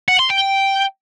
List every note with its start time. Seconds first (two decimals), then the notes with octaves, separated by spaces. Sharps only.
0.08 F#5
0.19 C6
0.30 G5